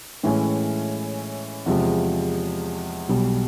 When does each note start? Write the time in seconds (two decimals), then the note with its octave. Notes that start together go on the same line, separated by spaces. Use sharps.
0.24 A2 E3 G#3 C#4
1.66 E2 C3 F3 G#3
3.09 B1 B2 G3